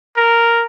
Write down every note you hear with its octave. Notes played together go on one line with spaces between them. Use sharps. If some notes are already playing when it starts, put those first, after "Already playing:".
A#4